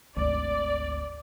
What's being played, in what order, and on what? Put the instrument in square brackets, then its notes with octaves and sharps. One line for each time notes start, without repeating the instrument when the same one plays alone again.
[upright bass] G#1 D2 [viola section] D5